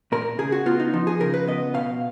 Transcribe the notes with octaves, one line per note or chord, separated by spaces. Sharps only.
A#2 A#4
C#3 G#4
F#4
B3 F4
D#4
F3 D#4
G#4
C#3 A#4
B4
B3 D#5
B2 F5